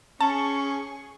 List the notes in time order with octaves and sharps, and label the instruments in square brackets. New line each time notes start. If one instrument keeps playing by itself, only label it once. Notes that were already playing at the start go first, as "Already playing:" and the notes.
[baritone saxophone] C#4 [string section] G#4 C#6 [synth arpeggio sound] A5